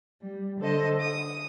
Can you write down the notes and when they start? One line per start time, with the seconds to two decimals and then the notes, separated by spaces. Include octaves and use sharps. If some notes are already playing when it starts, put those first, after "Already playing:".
0.22 G3
0.60 D3 A4 C5 D#5
1.00 D#6